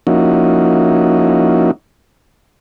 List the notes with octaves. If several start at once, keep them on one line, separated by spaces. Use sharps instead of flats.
F3 A#3 C#4 D#4 E4 F#4